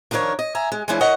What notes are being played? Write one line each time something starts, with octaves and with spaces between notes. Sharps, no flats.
D#3 F3 D4 A#4 C#5
D#5
E5 G#5 A#5
G#3
E3 F3 G#3 C#4 D4 E4
A#4 C#5 D#5 F#5